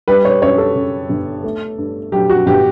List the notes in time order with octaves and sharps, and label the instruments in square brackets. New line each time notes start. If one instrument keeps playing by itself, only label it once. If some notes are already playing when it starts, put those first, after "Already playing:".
[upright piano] G3 B4
C#5
F#2 C#5
A4
C#3
G1
A3
G2
F#3 G4
F#4
G1 G4